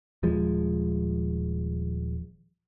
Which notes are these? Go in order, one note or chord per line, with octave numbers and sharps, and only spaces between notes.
D#1 F3 G#3